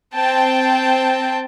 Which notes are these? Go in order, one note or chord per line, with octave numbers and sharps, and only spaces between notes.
C4 G5 A5